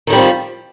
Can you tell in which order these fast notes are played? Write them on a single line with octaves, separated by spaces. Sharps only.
D#3 D3 G3 C4 F3